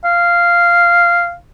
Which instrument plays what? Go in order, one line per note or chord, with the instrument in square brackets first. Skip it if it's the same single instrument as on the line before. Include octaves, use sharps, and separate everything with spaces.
[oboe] F5